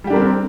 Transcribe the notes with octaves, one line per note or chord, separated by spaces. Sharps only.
G3 C4 D4 G4 A#4